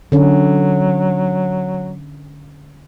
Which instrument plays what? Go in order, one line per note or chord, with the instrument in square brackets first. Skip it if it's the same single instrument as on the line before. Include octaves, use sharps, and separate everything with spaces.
[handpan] D3 C#4 [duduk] F#3